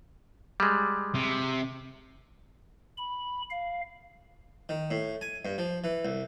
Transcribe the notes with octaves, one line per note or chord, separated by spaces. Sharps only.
G3 G#3
C3
B5
F5
D#3
A2
G#5
G2
F3
E3
C2